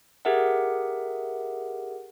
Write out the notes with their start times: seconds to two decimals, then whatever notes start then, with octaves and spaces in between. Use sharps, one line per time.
0.25 G4 G#4 A#4 E5 F#5